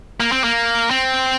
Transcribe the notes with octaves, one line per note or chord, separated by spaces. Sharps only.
A#3
C4
A#3
C4